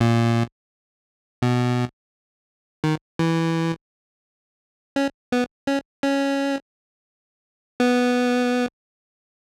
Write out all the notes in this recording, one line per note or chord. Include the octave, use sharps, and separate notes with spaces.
A#2
B2
D#3
E3
C#4
B3
C#4
C#4
B3